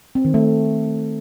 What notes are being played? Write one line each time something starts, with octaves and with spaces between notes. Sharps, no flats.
C4
D#3
A3